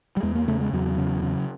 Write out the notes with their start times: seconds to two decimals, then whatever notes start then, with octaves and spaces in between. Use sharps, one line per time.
0.17 G3
0.23 E2 G#3
0.35 A#3
0.48 C#3 A3
0.61 G#3
0.73 E2 F#3
0.98 C#3
1.23 C#3